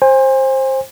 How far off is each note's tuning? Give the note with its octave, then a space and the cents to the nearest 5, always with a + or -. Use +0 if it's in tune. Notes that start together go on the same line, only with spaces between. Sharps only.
C5 +20 G#5 -35